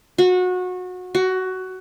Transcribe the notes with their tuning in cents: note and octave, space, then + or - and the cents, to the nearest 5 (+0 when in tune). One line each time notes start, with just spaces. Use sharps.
F#4 -25
F#4 +15